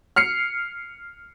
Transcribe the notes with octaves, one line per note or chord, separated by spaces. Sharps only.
F6 C7 C#7